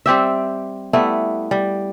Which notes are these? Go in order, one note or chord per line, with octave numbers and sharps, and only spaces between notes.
G3 C4 G4 E5
G3 A3 B3 E4
G3